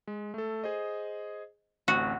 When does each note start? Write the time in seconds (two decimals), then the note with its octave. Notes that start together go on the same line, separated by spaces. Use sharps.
0.07 G#3
0.34 A3 A4
0.64 G#4 C5 D#5
1.88 A1 D2 C4 F#4